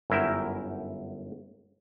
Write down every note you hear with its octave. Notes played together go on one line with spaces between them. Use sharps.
G1 F#2 E4 A#4 E5 G5